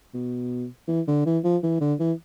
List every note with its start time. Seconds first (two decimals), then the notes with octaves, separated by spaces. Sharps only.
0.14 B2
0.88 E3
1.08 D3
1.26 E3
1.44 F3
1.63 E3
1.81 D3
2.00 E3